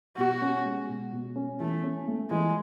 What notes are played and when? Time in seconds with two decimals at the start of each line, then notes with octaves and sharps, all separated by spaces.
0.17 B2 F#4
0.42 C#4
0.65 G#3
0.89 B2
1.12 B2
1.36 C#4
1.60 E3 A3
1.83 C#4
2.07 A3
2.30 E3 G#3